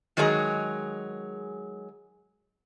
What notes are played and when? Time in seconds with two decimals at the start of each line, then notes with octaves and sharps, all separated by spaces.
0.17 D#3 F#3 G#3 G#4 C#5 A#5